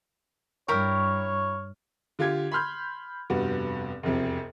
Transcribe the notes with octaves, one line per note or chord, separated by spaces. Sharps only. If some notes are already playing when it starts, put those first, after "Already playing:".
G2 E4 A#4 C#5 G5 C#6 F6
D3 F4 G4 G#6
B5 C6 F6 G6
F1 G2 B3 F#4
E1 C2 F2 C3